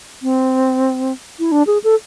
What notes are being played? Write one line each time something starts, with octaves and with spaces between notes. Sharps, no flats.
C4
E4
D4
G#4
A4